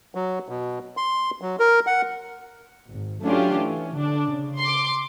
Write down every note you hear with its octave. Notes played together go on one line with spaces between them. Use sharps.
F#3
B2
C6
F#3
A#4
F#5
G#1
F#3 A3 C#4 D4 F4 G4
E3 C#4
D3 D4
C#3
C6 D6